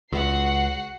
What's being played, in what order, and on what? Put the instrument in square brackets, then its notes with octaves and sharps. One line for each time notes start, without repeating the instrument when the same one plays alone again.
[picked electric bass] C#2 [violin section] F#4 F#5 C7